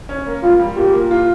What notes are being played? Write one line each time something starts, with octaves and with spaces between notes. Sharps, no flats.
C#4
A#3
G3 F4
G3
A#2 G4
A#3
F4